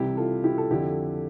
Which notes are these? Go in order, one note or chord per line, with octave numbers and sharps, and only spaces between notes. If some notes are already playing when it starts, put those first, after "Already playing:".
Already playing: C2 C3 E3 E4 G4
F4 A4
E4 G4
A4
F2 D3 F3 E4 G4